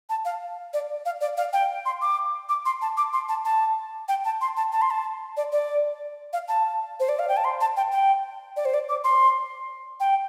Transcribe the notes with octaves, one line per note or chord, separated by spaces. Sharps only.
A5
F5
D5
F5
D5
F5
G5
C6
D6
D6
C6
A5
D6
C6
A5
A5
G5
A5
C6
A5
A5
C6
A5
D5
D5
F5
A5
C5
D5
F5
G5
A5
C6
A5
G5
G5
D5
C5
D5
D6
C6
G5